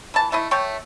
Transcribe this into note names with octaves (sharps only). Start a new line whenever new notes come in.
E3 A5
A3 E4 D#5
A3 C#5 G5